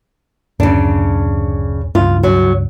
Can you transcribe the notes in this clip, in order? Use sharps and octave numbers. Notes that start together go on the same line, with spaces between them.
D1 F#2 C#3 D4
C#2 G2 F4
F#3